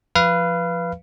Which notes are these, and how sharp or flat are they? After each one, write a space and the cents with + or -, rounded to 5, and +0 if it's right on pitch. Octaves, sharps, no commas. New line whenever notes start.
F3 +0 B4 +0 F5 -25